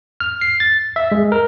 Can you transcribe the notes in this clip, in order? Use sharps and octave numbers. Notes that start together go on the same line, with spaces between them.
F6
C7
A6
E5
G#3
A#4